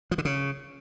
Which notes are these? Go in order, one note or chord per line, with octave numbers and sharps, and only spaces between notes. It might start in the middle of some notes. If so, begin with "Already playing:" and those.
F3
D3
C#3